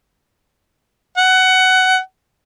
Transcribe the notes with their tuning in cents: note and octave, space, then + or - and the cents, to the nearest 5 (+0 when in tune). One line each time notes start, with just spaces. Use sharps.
F#5 +15